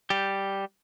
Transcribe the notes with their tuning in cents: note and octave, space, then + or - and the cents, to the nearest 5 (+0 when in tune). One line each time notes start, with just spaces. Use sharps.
G3 +0 G4 +0